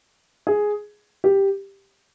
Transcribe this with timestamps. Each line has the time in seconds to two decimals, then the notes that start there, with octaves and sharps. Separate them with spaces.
0.47 G#4
1.24 G4